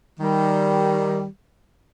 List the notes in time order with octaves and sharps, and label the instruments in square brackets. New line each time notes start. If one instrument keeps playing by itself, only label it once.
[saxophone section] D#3 G3